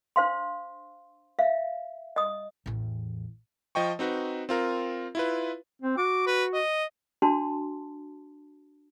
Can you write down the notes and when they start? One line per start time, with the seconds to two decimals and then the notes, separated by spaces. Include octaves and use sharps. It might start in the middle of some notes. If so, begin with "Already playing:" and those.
0.16 D4 C5 F5 C6
1.39 E5 F5
2.16 D#5 D#6
2.66 A1 E2
3.75 F3 D#5 G5 C#6
3.99 C4 D#4 F#4 B4
4.49 C4 F4 A#4
5.15 E4 F4 B4
5.82 C4
5.97 F#4 D6
6.26 B4
6.54 D#5
7.22 D4 F#4 A5 C6